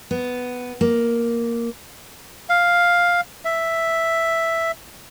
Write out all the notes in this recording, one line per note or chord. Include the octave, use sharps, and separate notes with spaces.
B3
A#3
F5
E5